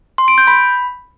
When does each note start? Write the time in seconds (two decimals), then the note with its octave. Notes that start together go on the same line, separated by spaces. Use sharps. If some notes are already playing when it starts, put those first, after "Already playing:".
0.18 C6
0.28 D7
0.38 G6
0.47 B5